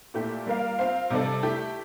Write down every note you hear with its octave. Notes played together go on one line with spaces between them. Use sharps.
A#2 A3 E4 G4
G3 A#3 F4 A#4 F5
C4 F4 C5 F5
C3 G3 D4 A4 D5
A3 E4 G4